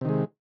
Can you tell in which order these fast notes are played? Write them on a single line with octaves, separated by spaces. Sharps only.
C3 D#3 G#3